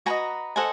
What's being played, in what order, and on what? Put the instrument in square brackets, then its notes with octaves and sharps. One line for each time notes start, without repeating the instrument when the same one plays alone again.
[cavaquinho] F#4 B4 D#5 G#5 A#5
A4 C5 D#5 F#5 G#5